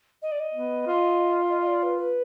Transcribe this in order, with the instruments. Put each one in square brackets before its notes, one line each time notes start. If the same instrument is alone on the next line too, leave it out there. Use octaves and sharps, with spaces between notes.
[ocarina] D#5
D5
D#5
[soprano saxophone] B3
F4
[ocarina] D#5
D#5
D5
B4
B4